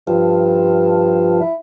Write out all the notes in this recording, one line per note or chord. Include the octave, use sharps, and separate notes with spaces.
G2 F3
E4